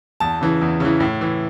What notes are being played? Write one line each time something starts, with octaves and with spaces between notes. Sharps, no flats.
E2 A5
C#3 E3
E2
C#3 E3
A2
E3